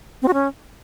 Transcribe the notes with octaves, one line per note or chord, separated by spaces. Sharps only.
C4
F#4
C#4